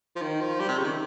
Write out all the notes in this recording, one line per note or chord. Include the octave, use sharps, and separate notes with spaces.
F3
D#3
F3
G3
C3
C#3
D#3